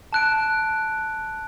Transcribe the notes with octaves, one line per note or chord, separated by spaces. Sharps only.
A5 F#6 D7